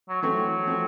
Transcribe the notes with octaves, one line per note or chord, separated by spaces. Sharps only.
F#3
E3 F#3 A3 C4
F3 A3 C4